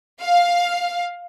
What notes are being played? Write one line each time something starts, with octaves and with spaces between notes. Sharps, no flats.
F5